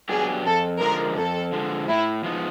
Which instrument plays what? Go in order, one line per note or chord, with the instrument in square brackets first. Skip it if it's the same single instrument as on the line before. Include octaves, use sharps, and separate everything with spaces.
[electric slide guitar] F#3 B3 D4 G4 [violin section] G#4
[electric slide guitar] F2 [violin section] A4
[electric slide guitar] D3 F3 G#3 [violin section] A#4
[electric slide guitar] F2 [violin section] A4
[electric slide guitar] D3 F3 G#3
[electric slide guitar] A2 [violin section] E4
[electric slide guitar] F3 G#3 B3 D#4